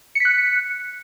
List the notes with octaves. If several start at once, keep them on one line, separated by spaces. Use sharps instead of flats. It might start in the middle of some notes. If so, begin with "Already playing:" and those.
F#6 B6 C#7